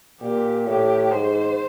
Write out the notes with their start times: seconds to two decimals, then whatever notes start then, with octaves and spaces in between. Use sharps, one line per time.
0.21 A#2 G4
0.67 A2 G4
1.12 G#2 C5